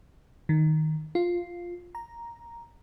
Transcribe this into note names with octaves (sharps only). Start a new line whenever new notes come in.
D#3
F4
A#5